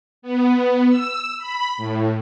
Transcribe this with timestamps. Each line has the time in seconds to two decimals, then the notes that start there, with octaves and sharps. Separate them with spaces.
0.22 B3
0.89 E6
1.38 B5
1.77 A2